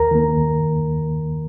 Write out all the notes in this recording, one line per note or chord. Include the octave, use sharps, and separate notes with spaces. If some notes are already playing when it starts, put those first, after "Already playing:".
Already playing: D#2 A#4 A#5
D#3 A#3
D#2